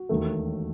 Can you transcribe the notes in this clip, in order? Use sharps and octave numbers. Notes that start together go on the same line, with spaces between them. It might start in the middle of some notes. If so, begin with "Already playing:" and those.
Already playing: F#4
E1 D#2 D#3 A3